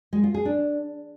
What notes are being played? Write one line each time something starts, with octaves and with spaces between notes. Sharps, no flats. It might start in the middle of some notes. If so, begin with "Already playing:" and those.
G#3
F4
G#4
D4